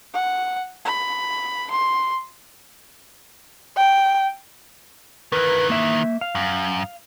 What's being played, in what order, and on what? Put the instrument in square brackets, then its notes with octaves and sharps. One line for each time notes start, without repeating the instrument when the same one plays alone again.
[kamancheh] F#5
B5
C6
[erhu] G5
[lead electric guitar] D#3 E3 [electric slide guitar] A#4 B4
[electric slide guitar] A#3 E5
F5
[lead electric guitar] F#2